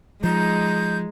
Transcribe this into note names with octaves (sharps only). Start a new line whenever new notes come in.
F3 G#3 D#4 G6